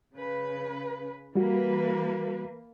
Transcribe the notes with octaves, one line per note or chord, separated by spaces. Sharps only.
C#3 B4
E3 G3 A#3 F#4 B4